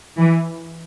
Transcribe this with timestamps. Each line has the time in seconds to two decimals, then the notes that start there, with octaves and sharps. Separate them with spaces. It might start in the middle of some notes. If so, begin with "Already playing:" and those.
0.17 E3